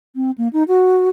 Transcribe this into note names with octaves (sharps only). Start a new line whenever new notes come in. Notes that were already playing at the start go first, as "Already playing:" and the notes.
C4
A#3
D#4
F#4